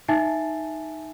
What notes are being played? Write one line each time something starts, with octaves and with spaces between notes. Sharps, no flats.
D#4 E5 G#5 A5 A6 C7